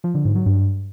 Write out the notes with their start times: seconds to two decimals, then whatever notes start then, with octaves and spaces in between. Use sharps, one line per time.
0.04 F3
0.14 D3
0.25 G#2
0.35 F#3
0.46 G2